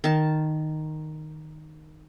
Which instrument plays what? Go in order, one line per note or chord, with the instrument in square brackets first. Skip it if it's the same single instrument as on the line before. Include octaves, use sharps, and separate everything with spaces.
[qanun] D#3 A5